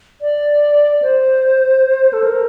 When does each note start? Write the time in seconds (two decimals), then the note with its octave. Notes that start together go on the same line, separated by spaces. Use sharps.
0.21 D5
1.02 C5
2.13 A4
2.24 A#4